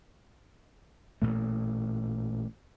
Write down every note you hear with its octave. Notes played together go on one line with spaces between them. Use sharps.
A1 A#2 A3